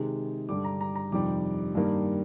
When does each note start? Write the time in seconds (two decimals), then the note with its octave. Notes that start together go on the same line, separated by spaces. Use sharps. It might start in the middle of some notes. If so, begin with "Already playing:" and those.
Already playing: C3 D#3 G#3
0.49 G2 D3 G3 D6
0.64 A#5
0.81 A#5
0.95 A#5
1.12 F2 C3 D#3 G3 D6
1.75 G2 D#3 G3 A#3